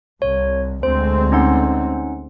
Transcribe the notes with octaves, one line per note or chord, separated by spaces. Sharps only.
C2 C#5
D2 G#3 C4 C5
C#4 D#4 F#5